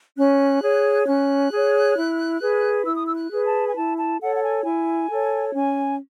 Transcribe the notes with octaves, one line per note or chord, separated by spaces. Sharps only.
C#4 F#6
G#4 C#5
C#4 F#6
G#4 C#5
E4
G#4 B4
E4 E6
D#6
E6
F#6
G#4 B4
A5
G#5
E4 A5
A5
A4 C#5 F#5
F#5
G#5
E4 G#5
A4 C#5
C#4 G#5